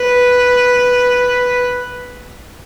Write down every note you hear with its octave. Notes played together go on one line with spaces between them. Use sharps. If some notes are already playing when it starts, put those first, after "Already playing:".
Already playing: B4